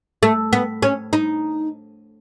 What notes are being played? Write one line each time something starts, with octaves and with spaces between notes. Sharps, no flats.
A3
B3
C#4
D#4